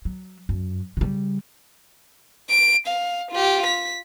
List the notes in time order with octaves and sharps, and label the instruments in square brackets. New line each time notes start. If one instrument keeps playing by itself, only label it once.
[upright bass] F#3
F#2
C#3 G3
[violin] D7
F5
F4 G4
B6